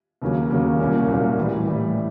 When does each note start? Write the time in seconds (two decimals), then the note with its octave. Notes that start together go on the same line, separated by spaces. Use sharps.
0.22 D#2 C#3 F#3 A#3 C#4
0.50 D#2 C#3 F#3 A#3 C#4
0.79 C2 A#2 F#3 A#3 C#4
1.08 C2 A#2 F#3 A#3 C#4
1.37 A2 E3 G3
1.66 A2 E3 G3